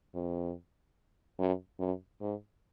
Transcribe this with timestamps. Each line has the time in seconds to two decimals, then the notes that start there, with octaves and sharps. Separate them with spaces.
0.15 F2
1.39 F#2
1.80 F#2
2.21 G#2